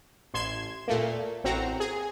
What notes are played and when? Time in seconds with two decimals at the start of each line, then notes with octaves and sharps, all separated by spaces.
0.34 A1 C6 G#6 E7
0.88 A#2 A3 A#3
1.44 A1 C4 F#4 A#5
1.80 G#4